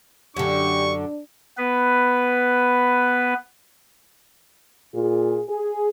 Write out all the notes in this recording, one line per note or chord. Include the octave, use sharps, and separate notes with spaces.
F#2 D3 D4 G4 C#6
B3 B4
A#2 F4 G#4
G#4